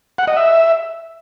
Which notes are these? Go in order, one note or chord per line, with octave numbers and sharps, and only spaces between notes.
F#5
D#5
E5